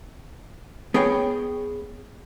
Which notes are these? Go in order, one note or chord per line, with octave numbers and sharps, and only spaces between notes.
B3 G#4 C#5 G5